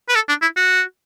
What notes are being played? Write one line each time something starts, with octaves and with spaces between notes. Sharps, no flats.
B4
A4
D4
E4
F#4